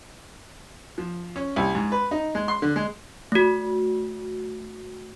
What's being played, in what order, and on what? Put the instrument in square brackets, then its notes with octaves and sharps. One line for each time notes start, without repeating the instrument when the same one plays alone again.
[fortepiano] F3
C#4
C2
G#2
B4
D#4
G#3
C6
D3
G#3
[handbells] A3 F#4